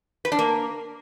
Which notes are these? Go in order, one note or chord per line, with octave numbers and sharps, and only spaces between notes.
B4
D4
A#3